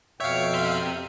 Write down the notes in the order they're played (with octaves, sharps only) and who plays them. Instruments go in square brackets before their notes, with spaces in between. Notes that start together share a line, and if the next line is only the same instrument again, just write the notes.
[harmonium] F2 B2 G5 [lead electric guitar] C#5 [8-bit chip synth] E5 F5
[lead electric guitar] C3 C6